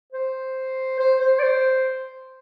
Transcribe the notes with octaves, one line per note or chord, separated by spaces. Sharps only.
C5
C5
C5
D5
C5